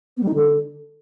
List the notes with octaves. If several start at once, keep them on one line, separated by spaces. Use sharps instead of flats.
B3
G3
D#4
D3